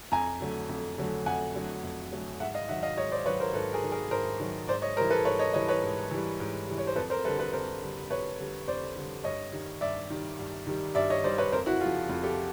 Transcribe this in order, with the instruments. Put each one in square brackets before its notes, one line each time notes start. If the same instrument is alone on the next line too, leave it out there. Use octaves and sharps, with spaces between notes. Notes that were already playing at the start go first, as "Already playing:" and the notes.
[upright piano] F2 G#5 A#5
D3 F#3 A3
F2
D3 F#3 A3
F2 F#5 G#5
D3 F#3 A3
F2
D3 F#3 A3
G#2 E5 F#5
D#5 F5
D#3 F#3 E5 F#5
D#5 F5
G#2 C#5 D#5
C5 D5
D#3 F#3 B4 C#5
A#4 C5
G#2 A4 B4
G#4 A#4
D#3 F#3
G#4 A#4
G#2 A#4 C5
D#3 F#3
G#2 C5 D5
C#5 D#5
G3 A#4 C5
E3
A4 B4
G#2 B4 C#5
C#5 D#5
E3 G3 C#5 D#5
B4 C#5
G#2
E3 G3
G#2
E3 G3
C#5
C5
F2 A4 B4
A#4 C5
G3 A4 B4
D3
A4 B4
F2 A#4 C5
D3 G3
F2 B4 C#5
D3 G3
F2 C5 D5
D3 G3
G2 C#5 D#5
D#3 G3
G2 D5 E5
D#3 G3
G2
D#3 G3
G2 D5 E5
C#5 D#5
D#3 G3 C5 D5
B4 C#5
F2 A#4 C5
E4 F#4
C#3 F4
F3
F2 F4
G4 A4